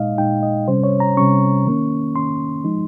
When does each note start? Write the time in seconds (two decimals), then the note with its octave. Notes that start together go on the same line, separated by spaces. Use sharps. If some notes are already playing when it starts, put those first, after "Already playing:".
Already playing: A#2 G#3 D#4 D#5 F5
0.18 A#2 G#3 D#4 G5
0.43 D#5
0.68 C3 G3 C#4 C5
0.84 C#5
1.00 A#5
1.17 C3 G3 C#4 C#6
1.66 D#3 A#3 C#4
2.16 D#3 A#3 C#4 C6
2.65 F3 G#3 D#4